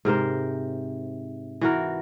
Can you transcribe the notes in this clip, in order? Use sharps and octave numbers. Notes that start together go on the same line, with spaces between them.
G#2 C3 A#4 C5
E3 F#4 A#4